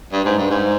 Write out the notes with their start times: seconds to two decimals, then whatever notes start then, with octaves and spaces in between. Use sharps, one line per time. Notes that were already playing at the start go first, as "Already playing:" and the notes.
0.12 G2
0.25 G#2
0.38 G2
0.50 G#2